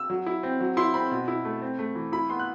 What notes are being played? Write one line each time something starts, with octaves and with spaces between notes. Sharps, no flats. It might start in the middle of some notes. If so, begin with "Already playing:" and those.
Already playing: E6
F#3
E4
C4
F#3
E4 C6
C4 B5
B2
E4
A3
C4
A3
E3
E4 B5
B3 C6
F#6